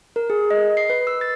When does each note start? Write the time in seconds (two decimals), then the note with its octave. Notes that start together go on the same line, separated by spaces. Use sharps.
0.16 A#4
0.30 G#4
0.51 D#5
0.77 C7
0.90 B4
1.07 E6
1.21 A6